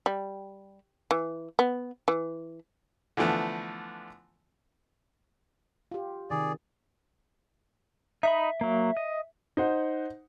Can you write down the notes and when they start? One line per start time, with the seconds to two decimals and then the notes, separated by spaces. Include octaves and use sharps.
0.06 G3
1.11 E3
1.59 B3
2.08 E3
3.17 D3 E3 F3 A3 B3
5.91 F4 G4
6.30 C3 D#3 G#4 D5
8.23 D#4 D#5 E5 B5
8.61 F#3 A#3
8.97 D#5
9.57 D#4 C5 F#5